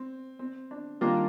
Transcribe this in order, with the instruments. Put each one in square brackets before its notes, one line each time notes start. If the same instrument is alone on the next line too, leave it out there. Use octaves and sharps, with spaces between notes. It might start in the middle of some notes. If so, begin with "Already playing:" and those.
Already playing: [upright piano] C4
C4
D4
[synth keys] D#3 G3 A#3 D4 F4 [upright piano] C4